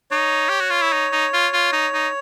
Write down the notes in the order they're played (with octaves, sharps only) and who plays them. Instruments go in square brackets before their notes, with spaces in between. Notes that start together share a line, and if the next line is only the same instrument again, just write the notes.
[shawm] D#4 [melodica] C#5
[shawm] G4
F#4
F4
E4
D#4
D#4
F4
F4
D#4
D#4